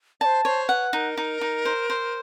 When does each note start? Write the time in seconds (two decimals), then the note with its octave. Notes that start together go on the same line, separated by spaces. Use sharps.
0.21 C5 D5 A5
0.45 C5 C#5
0.68 B4 F#5
0.93 D#4 A#4
1.17 D#4
1.41 D#4
1.65 C5
1.90 C5